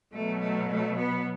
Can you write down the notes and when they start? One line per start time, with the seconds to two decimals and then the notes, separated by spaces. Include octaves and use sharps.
0.12 B2 F#3 A3
0.41 A3
0.70 A3
0.99 B3